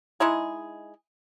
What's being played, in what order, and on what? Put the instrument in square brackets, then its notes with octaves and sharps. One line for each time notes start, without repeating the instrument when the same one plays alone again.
[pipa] G#3 D#4 E4 G#4